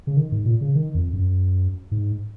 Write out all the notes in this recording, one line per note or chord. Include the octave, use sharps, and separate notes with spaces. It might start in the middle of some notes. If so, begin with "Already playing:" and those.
C#3
D#3
G#2
A#2
C#3
D#3
F2
F#2
G#2